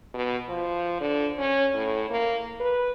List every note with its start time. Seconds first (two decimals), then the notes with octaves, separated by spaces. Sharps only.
0.14 B2
0.49 F3
1.01 D3
1.38 C#4
1.74 A2
2.10 A#3
2.60 B4